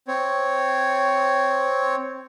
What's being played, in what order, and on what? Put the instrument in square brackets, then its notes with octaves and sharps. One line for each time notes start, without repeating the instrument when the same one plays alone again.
[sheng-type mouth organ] C4 C#5